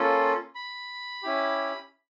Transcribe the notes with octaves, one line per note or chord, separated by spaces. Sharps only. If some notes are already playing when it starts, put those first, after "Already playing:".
Already playing: A#3 C#4 F4 A4
B5
C#4 E4 G4